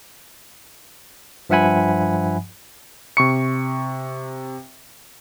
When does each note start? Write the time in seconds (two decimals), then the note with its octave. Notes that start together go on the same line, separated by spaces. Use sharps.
1.50 G2 F3 E5 F#5 G#5 B5
3.17 C3 C#6 C#7